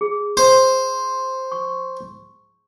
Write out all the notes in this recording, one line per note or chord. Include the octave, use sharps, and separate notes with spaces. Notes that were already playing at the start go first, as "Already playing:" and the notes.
G#4
C5
C#6